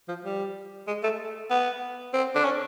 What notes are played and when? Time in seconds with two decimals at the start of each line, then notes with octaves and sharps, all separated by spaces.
0.08 F3
0.25 G3
0.87 G#3
1.03 A3
1.50 B3
2.13 C4
2.35 D4
2.45 C#4